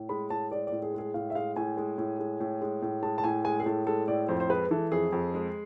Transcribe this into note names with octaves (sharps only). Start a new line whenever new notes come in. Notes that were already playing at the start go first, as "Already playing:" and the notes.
Already playing: A2
G#3 B5
A2 A5
G#3 D5
D5
A2
G#4
G#3 G#4
A2 F5
E5
G#3 F5
A2 G#5
G#3
A2
G#3
A2
G#3
A2
G#3 A5
A5
A2 G#5
G#3 G#5
G#4
A2 A4
G#3 A4
A2 D5
F2 C5
C5
G#3 B4
E3 A4
F2 G#4
F2
G#3